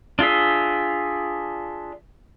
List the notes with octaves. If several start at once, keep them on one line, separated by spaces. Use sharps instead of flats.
D4 F4 G#4 E5